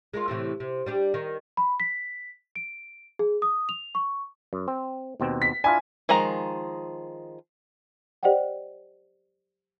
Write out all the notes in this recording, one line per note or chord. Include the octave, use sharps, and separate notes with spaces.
G#3 A#3 F4
A2 C3 E3
C3
G3 D4 G4
D#3
B5
B6
D7
G#4
D#6
F7
C#6
F#2
C4
D#2 B2 C4
B6
D4 E4 F4 G#5
D#3 F3 G#3 A#5
G4 C5 D5 D#5 F#5 G5